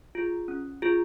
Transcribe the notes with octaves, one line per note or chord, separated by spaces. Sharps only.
F4 G#4
C#4
F4 G#4